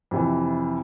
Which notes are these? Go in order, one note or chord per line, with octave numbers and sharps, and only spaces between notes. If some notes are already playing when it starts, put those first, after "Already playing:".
F2 C3 E3